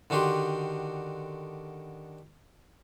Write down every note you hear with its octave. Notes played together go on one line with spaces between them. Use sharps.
D3 D#3 F#4 G4 C6